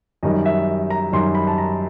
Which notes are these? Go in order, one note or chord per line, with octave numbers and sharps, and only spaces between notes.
F#2 D#3 G3 D#5
E5
A#5
F#2 D#3 G3 C6
B5
A5
A#5